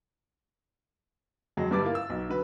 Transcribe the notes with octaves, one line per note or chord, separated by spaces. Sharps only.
F2 F#3 G#3
G1 G2 G3 D6 A6
A#3 E4 F4
E6
B1
D3 F#3 B4